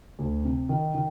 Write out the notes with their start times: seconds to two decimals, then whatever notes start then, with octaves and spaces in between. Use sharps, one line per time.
0.19 D2
0.44 C3
0.69 D#3
0.94 D#3